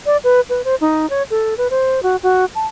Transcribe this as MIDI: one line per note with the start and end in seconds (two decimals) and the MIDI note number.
0.06 0.17 74
0.24 0.41 71
0.50 0.62 71
0.65 0.75 72
0.81 1.09 63
1.10 1.23 73
1.30 1.54 69
1.58 1.68 71
1.70 2.03 72
2.03 2.16 66
2.23 2.45 66
2.55 2.67 81